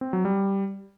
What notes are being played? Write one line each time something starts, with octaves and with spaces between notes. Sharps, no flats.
C4
F#3
G3